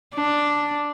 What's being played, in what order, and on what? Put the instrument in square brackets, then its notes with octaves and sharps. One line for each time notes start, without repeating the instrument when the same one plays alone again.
[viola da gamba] D4